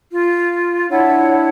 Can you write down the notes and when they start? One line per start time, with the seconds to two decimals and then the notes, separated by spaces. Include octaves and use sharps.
0.12 F4
0.90 D4 E4 C#5 F#5